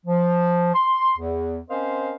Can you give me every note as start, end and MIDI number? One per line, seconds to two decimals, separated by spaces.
0.06 0.73 53
0.75 1.12 84
1.17 1.59 40
1.69 2.14 60
1.69 2.14 61
1.69 2.14 70
1.69 2.14 72
1.69 2.14 75
1.69 2.14 77